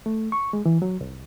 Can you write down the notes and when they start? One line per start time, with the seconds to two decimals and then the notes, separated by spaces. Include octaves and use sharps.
0.06 A3
0.32 C#6
0.53 G#3
0.66 E3
0.82 F#3
1.01 C2